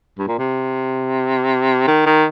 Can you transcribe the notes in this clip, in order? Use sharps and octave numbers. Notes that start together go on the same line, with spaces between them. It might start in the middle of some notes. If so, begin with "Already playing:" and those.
G2
A#2
C3
D#3
D#3